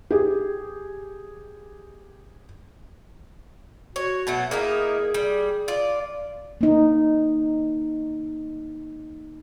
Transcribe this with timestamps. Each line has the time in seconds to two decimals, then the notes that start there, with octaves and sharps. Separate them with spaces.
0.11 G4 G#4
3.96 F#4 C#5
4.27 B2 F#3 A3
4.51 A#3 D#4 E4 G#4
5.14 G3
5.68 F4 D5
6.61 A#3 D#4